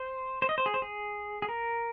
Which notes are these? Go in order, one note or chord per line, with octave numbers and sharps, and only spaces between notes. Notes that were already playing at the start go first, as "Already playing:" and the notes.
Already playing: C5
C5
D#5
C5
G#4
C5
G#4
G#4
A#4